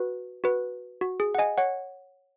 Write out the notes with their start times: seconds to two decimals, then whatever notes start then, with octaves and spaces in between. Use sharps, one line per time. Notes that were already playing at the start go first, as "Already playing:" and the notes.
Already playing: F#4 B4
0.44 F#4 B4
1.01 F#4
1.20 G#4
1.35 F#5
1.38 D#5 G#5
1.58 C#5 F#5